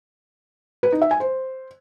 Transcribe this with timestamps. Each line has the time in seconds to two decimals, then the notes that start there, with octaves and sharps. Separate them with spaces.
0.83 B4
0.92 D#4
1.02 E5
1.11 G#5
1.20 C5